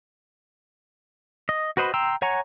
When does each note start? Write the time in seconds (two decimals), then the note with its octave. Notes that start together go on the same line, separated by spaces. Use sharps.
1.49 D#5
1.77 F#4 B4 C5 D#5 B5
1.94 G5 A#5 C6 E6
2.22 C#5 F#5 G#5 A#5 C#6